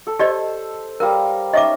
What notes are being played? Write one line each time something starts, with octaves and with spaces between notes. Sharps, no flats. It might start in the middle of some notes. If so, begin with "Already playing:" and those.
A4
G4 C5 D5 D#5
G3 A#4 F5 A#5
C#4 D#4 D#5 E5 D6